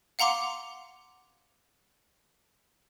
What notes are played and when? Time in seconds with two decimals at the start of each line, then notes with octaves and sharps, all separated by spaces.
0.19 F5 F#5 A#5 C6 D6